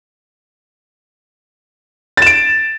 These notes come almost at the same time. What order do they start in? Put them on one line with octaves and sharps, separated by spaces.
A6 E7 D7